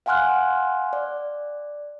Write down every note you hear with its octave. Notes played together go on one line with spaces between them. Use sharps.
F5 F#5 G#5 C6 F6 F#6
D5